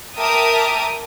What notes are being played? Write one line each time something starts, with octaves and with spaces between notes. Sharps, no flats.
A#4 E5 G5 A5 D6 D#6